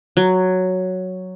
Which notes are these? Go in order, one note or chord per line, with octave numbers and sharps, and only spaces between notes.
F#3